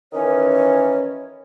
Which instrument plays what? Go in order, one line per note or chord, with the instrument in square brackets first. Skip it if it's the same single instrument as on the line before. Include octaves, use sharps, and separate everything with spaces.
[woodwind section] D#3 E3 C#4 C#5